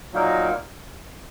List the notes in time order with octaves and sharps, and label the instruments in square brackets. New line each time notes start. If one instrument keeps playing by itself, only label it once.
[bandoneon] A#2 F#3 A#3 D#4 A#4